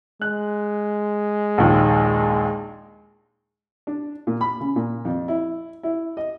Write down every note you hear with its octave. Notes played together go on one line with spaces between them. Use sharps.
G#3 F#6
A#1 D#2
D4
A#2
B5
C#3
A#2
F2
E4
E4
D#5